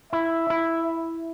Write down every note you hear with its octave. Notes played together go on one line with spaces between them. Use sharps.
E4 E5
E4